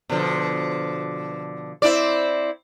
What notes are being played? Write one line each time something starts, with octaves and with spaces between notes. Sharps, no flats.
B2 D3 F3
C4 E4 D5